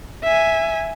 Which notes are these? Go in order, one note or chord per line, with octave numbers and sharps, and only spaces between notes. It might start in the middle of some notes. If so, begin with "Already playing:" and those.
E5 G#5